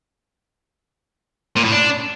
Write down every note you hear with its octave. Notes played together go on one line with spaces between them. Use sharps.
A#2
A2
D4